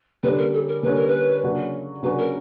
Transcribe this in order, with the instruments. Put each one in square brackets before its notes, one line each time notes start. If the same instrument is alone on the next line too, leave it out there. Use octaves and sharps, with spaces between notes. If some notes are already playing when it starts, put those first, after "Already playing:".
[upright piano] D3 G3 A#3 C#4 [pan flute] B4
[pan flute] A#4
A4
A#4
[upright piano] D3 G3 A#3 C#4 [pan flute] B4
[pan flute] A#4
B4
[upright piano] C#3 F#3 A#3 D4 F#4
[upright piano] C#3 F#3 A#3 D4 F#4 [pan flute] B4
[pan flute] A#4